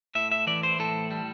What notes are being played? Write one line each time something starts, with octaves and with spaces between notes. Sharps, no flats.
A2 E5
E5
E3 D5
C5
A2 A4
G3